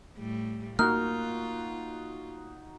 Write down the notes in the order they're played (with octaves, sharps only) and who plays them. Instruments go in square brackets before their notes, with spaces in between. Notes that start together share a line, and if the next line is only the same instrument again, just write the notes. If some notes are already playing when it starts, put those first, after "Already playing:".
[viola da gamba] A2 G3
[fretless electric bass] A#3 [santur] D#4 F#4 [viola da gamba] F4 [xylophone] F6